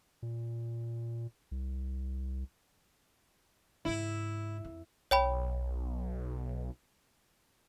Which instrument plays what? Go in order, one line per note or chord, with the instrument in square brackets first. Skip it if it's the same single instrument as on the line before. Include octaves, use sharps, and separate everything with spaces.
[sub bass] A#2
C2
[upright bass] G#2 C#3 [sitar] E4
[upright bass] F2
[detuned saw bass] B1 [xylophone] C#5 G5 B5